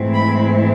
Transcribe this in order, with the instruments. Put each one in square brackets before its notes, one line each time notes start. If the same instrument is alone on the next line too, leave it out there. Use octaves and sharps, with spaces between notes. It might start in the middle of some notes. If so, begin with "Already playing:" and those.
Already playing: [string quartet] G#2 E3 A3 C4 E4
B5